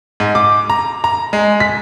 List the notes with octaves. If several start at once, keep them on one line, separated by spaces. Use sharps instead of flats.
G#2
D6
A#5
A#5
G#3
B6